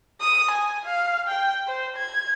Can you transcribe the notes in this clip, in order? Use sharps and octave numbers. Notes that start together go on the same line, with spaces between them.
D#6
G#5
F5
G5
C5
G#6